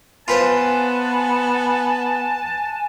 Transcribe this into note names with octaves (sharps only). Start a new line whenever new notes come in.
B3 F4 B4 C5 F#5 G#5 A5